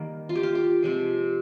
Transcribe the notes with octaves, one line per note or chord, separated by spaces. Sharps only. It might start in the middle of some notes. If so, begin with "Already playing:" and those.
Already playing: D#3 G3 A#3
F4
G4
F4
G4
C3 F3 G#3